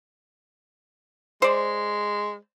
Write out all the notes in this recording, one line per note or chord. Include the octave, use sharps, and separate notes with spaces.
G#3 C5 D5